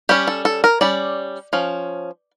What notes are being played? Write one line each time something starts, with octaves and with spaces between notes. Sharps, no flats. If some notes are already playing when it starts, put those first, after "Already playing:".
G3 C#4 G4
A4
A4
A#4
G3 C#4 D5
F3 C#4